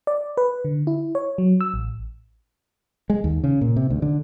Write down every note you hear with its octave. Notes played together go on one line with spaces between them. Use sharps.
D5
B4
D3
E4
C#5
F#3
E6
A1
G#3
D#2
C#3
A#2
C3
D2
D3